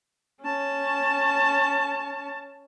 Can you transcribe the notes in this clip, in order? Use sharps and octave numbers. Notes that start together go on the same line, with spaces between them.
C#4 A5